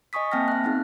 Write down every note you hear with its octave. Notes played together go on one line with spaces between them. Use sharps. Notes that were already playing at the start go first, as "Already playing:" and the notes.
D#5 G#5 C#6 D#6 B6
A#3 C4 G5 A5 F6 A#6
E5 F#6
B3 C4 D#4 G#4